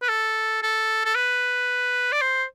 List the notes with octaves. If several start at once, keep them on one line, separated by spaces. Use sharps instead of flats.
B4
A4
A4
A4
B4
D5
C5